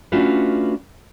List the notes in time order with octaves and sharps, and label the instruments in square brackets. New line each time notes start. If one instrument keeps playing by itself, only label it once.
[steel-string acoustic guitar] A3 C#4 D4 F4 F#4 B4